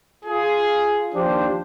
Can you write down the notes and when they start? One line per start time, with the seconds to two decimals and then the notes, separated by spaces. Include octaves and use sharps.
0.25 F4 G#4
1.14 D#2 F3 D4 G4 C5